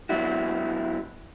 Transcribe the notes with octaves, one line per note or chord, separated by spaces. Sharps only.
F#3 B3 D4 E4 F#4